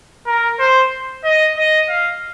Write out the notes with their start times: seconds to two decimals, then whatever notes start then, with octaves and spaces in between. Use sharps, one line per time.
0.27 A#4
0.59 C5
1.24 D#5
1.57 D#5
1.89 F5